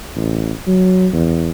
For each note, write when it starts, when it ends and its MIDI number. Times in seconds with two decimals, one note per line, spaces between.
0.17 0.52 33
0.68 1.07 54
1.13 1.51 40